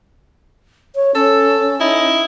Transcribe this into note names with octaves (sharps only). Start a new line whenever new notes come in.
C#5
C#4 A4
D#4 E4